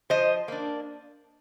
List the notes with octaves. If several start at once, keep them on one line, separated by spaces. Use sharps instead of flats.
F3 C5 D#5
A#3 D4